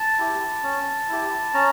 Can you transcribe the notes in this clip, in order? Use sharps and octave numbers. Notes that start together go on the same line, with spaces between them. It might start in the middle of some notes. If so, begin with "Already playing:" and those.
Already playing: A5
E4 G4
C#4
E4 G4
C#4 A#5